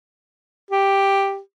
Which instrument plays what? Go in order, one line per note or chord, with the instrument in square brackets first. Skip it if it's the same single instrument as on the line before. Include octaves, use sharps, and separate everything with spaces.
[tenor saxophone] G4